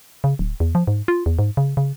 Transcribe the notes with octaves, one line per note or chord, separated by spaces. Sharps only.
C#3
D1
E2
F3
G#2
F4
E2
G#2
C#3
C#3